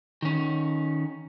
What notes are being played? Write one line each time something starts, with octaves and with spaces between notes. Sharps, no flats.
D#3 C#4